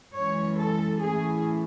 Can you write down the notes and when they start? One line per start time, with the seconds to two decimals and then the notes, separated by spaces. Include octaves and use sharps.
0.14 F#2 E3 G#3 C#4 C#5
0.59 A4
1.02 A2 E3 A3 C#4 G#4